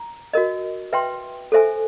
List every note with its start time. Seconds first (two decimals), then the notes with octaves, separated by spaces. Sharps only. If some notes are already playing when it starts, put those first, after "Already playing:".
Already playing: A#5
0.33 F#4 A#4 D#5
0.93 B4 E5 G5 C6
1.52 A4 C5 E5 G#5